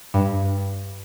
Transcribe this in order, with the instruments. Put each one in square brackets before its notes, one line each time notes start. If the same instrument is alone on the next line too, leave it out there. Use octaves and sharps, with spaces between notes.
[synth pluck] G2